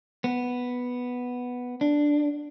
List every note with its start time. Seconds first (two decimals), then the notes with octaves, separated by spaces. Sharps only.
0.24 B3
1.81 D4